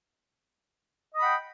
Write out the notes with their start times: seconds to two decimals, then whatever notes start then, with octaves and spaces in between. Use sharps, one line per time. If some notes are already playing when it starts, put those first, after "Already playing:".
1.13 D#5
1.16 D#6
1.19 B5
1.22 F#5
1.25 G5